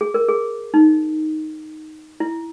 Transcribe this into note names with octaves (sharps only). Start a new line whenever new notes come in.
G#4
A#4
G#4
D#4
E4